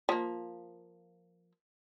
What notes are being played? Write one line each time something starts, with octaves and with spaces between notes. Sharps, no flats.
F3 A#3